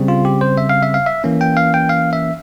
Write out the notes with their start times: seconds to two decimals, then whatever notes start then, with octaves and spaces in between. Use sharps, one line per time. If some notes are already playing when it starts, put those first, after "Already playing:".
Already playing: C#3 G3 C4
0.08 F4
0.25 G4
0.41 C5
0.58 E5
0.69 F5
0.83 E5
0.94 F5
1.06 E5
1.24 E3 A#3 C#4
1.41 G5
1.57 F5
1.74 G5
1.89 F5
2.13 E5